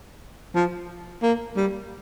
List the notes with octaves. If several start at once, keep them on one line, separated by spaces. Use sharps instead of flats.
F3
A#3
G3